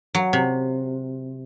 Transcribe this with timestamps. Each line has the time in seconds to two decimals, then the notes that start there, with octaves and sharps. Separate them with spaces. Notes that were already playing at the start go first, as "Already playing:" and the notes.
0.15 F#3
0.33 C3